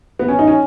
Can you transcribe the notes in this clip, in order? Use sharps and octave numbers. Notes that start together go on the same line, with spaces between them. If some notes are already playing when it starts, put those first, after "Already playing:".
B3
C#4
D#4
C#4